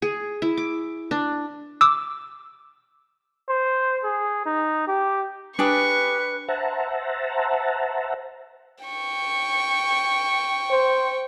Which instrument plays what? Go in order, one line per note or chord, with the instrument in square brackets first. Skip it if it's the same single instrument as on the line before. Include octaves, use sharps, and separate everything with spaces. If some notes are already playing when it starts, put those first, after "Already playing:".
[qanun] G#4
E4
D6
D4
[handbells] D6 E6
[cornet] C5
G#4
D#4
G4
[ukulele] D4 [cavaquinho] G4 G#4 D6 [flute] B4 [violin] C#6
[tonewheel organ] C5 E5 F#5 A5 A#5
[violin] G5 C#6
[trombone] C5